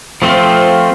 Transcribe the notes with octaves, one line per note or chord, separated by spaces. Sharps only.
F3 A3 C4 F4